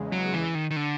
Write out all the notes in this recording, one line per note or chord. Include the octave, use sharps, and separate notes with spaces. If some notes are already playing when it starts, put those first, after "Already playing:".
Already playing: E2 C#3 G#3
F#3
E3
D#3
D#3
D3